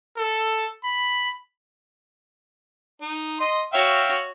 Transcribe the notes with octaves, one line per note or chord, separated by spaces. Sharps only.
A4
B5
D#4
D#5 C6
F#4 C#5 E5 F5 G5